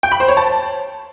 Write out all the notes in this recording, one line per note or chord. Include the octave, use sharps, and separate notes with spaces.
G5
B5
C5
C#5
A5